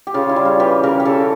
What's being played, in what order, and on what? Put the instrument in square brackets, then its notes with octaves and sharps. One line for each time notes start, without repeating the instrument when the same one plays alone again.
[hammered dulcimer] G4
C#3 F4
E4
G3
F4
E3 G4
C#3 A#4
G4
C#3 A4